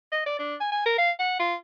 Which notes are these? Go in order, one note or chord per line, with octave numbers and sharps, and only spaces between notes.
D#5
D5
D4
G#5
G#5
A#4
F5
F#5
F4